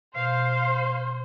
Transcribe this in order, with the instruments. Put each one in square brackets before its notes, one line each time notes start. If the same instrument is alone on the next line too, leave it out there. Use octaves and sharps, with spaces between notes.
[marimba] B2 [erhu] C5 [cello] F5